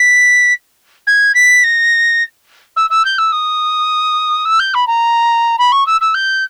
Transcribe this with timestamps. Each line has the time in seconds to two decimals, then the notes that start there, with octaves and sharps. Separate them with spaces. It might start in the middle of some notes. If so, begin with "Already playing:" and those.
Already playing: B6
1.07 G#6
1.34 B6
1.64 A#6
2.76 E6
2.90 E6
3.05 G6
3.18 E6
3.32 D#6
4.45 E6
4.59 G6
4.74 B5
4.87 A#5
5.58 B5
5.72 C#6
5.86 E6
6.01 E6
6.14 G6